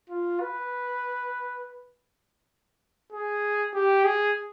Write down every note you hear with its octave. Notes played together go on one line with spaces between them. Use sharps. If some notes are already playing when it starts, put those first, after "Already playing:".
F4
B4
G#4
G4
G#4